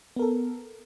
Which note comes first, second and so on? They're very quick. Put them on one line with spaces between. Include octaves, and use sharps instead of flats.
B3 A#4 A4